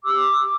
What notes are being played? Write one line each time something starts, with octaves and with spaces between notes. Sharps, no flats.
G4 D6 E6